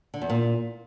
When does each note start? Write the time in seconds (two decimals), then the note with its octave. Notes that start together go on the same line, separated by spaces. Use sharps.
0.14 D3
0.22 E2
0.30 A#2